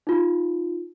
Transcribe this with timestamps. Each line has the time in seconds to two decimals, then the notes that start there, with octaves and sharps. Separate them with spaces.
0.07 D#4 F4